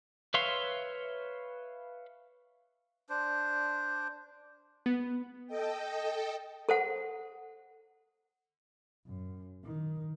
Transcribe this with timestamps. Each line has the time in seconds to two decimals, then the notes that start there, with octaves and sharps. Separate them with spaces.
0.34 B4 C#5 E5 F5 C6
3.09 D4 C5
4.86 B3
5.47 A4 D#5 G5
6.69 A4 C5 F#5
9.06 F#2
9.65 D#3